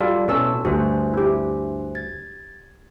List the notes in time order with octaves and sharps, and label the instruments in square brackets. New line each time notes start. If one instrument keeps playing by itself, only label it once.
[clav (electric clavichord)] G3 F4 A4 [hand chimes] F#4 [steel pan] D5
[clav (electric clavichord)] B2 C#4 [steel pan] E4 A4 E6
[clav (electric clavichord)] D2 G2 [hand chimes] D4 C5 E5 [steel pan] F#4
[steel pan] E4 G4
[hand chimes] G#6 A6